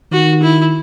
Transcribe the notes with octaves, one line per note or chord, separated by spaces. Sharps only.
D#3 F#4
E4